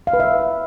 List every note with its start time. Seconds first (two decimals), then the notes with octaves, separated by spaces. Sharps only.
0.07 F5
0.13 B4
0.20 E5